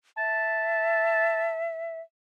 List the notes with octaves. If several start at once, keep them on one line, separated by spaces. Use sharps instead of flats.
E5 A5